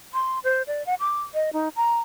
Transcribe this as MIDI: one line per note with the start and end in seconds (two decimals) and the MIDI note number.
0.14 0.39 84
0.44 0.62 72
0.67 0.85 74
0.86 0.95 78
1.00 1.22 86
1.34 1.50 75
1.53 1.69 63
1.76 1.99 82